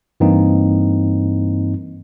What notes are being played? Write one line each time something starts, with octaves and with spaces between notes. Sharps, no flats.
G2 E3 A#3 C4 D#4